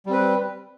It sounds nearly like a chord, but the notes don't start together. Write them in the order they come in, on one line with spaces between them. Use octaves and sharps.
G3 C4 B4